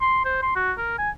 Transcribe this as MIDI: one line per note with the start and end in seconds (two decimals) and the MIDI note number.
0.01 0.21 84
0.25 0.42 72
0.43 0.55 84
0.56 0.73 66
0.78 0.98 70
0.99 1.11 80